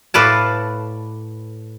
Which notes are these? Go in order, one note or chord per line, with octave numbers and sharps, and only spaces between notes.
A2 A4 B4 D5 F5 A5